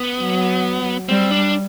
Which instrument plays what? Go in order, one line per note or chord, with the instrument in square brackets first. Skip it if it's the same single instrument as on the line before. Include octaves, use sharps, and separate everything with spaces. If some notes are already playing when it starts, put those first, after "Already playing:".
Already playing: [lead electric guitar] B3
[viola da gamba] F#3
[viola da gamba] G3 [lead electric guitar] C4
[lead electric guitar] D4